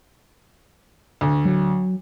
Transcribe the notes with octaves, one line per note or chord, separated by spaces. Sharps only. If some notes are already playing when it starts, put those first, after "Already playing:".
D2
F#3